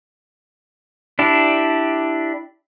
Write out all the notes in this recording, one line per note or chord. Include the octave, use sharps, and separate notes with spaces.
D4 E4 G4